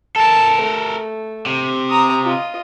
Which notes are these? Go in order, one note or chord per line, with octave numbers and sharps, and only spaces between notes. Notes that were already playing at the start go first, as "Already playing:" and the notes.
A4 A#4 A5
A3
C3
A#5 D#6
F4 D#5